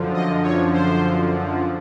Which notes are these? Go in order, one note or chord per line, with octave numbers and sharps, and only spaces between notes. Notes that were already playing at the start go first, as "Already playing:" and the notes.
Already playing: F#2 D3 F3
D#5
C#5
C5